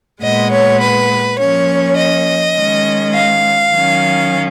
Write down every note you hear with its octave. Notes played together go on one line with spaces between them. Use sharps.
A#2 G#3 B3 D#5
C#5
B4
F3 A#3 C#4 C#5
D#5
D#3 G#3 C#4
F5
D#3 F#3 C#4